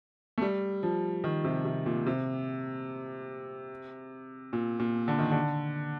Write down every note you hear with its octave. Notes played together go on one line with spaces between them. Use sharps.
A3
G3
F3
D#3
C3
C3
A#2
C3
A#2
A#2
D3
D#3
D3